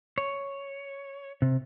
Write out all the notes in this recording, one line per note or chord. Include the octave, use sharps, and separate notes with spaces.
C#5
C3